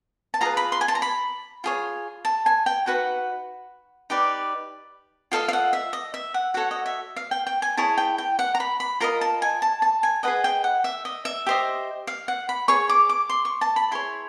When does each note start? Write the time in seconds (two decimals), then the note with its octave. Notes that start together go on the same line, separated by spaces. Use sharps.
0.34 A5
0.41 F4 G#4 B4 A#5
0.57 B5
0.72 C6
0.81 G#5
0.88 A5
0.95 A#5
1.02 B5
1.64 F4 G#4 C#5
2.25 A5
2.46 G#5
2.66 G5
2.86 D#4 F#4 B4 F#5
4.10 D#4 G4 B4 D5
5.32 F4 A4 C5 D#5 F5
5.48 F5
5.53 F#5
5.73 E5
5.93 D#5
6.14 E5
6.34 F#5
6.54 F#4 A4 C#5 F#5
6.71 D#5
6.86 E5
7.16 F5
7.31 G5
7.47 G5
7.62 G#5
7.77 E4 G#4 C#5 A5
7.98 G5
8.18 G5
8.39 F#5
8.55 A#5
8.60 B5
8.80 B5
9.00 F4 A#4 D#5 A#5
9.21 A5
9.42 G#5
9.62 A5
9.82 A5
10.03 G#5
10.23 G#4 B4 D#5 F#5
10.44 G5
10.64 F#5
10.84 E5
11.05 D#5
11.25 E5
11.47 G4 C5 D#5
12.07 F5
12.28 F#5
12.49 B5
12.68 G#4 C#5 C#6
12.89 D6
13.09 D6
13.30 C6
13.45 C#6
13.61 A5
13.76 B5
13.91 E4 G#4 C#5 C6